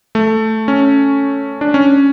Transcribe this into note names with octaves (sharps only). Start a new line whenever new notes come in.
A3
C#4
D4
C#4